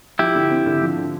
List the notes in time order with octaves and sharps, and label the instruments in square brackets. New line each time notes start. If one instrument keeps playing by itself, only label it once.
[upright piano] F3 [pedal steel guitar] E4 G4
[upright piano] D3
C4
D3
F3
D3